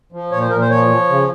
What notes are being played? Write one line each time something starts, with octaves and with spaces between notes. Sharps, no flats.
F3
A#2 C#5
C5
A#2 A#4
C5
F3 C#5
F3
C#3